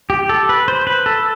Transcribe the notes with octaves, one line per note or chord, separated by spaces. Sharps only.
G4
A4
B4
C5
B4
A4